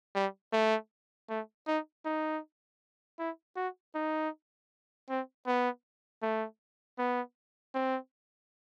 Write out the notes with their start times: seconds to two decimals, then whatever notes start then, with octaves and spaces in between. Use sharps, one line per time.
0.15 G3
0.52 A3
1.29 A3
1.67 D#4
2.05 D#4
3.18 E4
3.56 F#4
3.95 D#4
5.09 C4
5.46 B3
6.22 A3
6.98 B3
7.74 C4